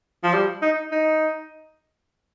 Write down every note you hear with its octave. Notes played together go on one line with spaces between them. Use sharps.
F3
G3
D#4
D#4